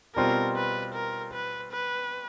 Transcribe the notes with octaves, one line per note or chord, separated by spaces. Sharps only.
B2 G3 C4 F4 A#4
B4
A#4
B4
B4